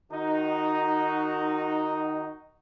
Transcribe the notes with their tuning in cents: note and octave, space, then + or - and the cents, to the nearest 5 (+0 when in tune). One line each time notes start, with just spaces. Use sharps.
D#3 -20 D#4 +0 F#4 +0